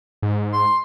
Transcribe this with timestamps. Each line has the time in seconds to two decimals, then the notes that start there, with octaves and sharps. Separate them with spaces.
0.22 G#2
0.53 C6